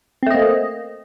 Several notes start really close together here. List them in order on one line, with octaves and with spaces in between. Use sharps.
C4 A3 D#5 A#3